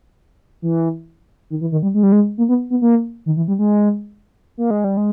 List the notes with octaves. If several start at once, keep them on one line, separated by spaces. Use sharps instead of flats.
E3
D#3
E3
D#3
G3
G#3
G3
G#3
A#3
B3
B3
A#3
D#3
E3
G3
G#3
A#3
G#3
G3
G#3